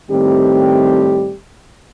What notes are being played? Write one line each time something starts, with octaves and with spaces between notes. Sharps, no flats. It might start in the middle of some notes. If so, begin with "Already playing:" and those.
A2 D#3 G3 C4 G4